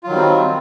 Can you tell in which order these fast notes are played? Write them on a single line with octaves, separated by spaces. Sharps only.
F4 F#3 D#3 G3 C4